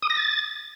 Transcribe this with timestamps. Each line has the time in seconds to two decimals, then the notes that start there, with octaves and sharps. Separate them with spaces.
0.02 D#6
0.10 A#6
0.17 A6